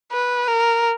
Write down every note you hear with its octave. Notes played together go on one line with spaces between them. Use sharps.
B4
A#4